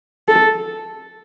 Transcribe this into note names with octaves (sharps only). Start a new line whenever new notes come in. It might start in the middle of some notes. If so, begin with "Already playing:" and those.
A4